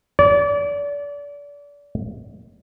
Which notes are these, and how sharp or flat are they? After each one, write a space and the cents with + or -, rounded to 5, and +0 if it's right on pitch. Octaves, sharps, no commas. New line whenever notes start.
D5 -30